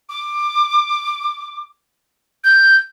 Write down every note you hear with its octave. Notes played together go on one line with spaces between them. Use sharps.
D6
G6